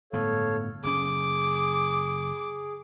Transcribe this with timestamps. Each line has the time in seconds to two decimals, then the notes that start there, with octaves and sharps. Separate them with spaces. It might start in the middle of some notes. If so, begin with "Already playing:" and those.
0.13 G1 A2 B3 A4 C#5 F5
0.84 F#1 B2 C#4 G#4 D6